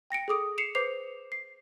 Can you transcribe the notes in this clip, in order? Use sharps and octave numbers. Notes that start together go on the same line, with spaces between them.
G5 A#6 C#7 D7
G#4 A4 D6 D#6 D7
C7 C#7 E7 F7
B4 C5 D6 C7 F7
C7